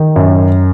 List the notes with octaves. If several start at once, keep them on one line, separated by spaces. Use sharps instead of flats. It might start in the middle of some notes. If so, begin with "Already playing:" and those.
Already playing: D#3
F#2